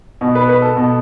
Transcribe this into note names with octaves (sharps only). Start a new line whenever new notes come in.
B2
B4
B4
A4
B2